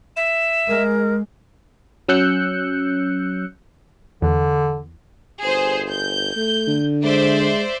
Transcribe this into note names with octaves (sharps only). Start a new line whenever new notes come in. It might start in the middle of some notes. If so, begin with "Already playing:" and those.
E5 E7
G#3 A#4
F#3 C#4 E6 F#6 G6 C#7
E2 D3
G1 G#4 C5
G6
A3
D3
G#3 C5 D5 E5